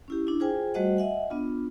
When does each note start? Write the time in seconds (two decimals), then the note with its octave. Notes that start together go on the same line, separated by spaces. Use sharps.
0.08 C#4 E4 G4
0.27 D4 E4
0.40 F4 G#4 C5 G5 G#5
0.74 G3 A3 F#4 C5 D#5 F#5
0.97 D#5 E5 F#5 G#5
1.30 B3 D4 F4